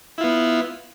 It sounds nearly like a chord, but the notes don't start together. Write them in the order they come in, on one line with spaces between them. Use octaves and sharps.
E4 F4 B3